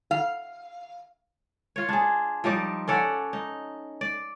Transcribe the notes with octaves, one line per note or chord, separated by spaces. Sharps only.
F5
F4 C#5
D4 G#4
F3 G3 D#4 D5
C#4 A4 D5 F#5
D#4
D5